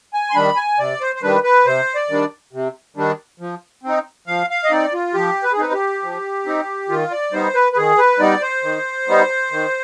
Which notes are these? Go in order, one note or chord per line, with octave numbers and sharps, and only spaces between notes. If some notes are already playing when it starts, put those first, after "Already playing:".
G#5
C6
D#3 G3 D4 B5
G#5
C3 D5
C5
C5
D#3 G3 D4 B4
B4
C3 C5
D5
D#3 G3 D4
C3
D#3 G3 D4
F3
C4 D#4
F3 F5
F5
D#5
C4 D#4 D5
F4
F3 G4
B4
G#4
C4 D#4 B4
G4
F3
C4 D#4
D#3 F4
D5
G3 B3 D#4 C5
B4
B4
D#3 G#4
B4
G3 B3 D#4 D5
C5
D#3
G3 B3 D#4
D#3